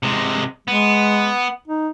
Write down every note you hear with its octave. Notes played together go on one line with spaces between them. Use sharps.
C3 G#3
G#3 B3
D#4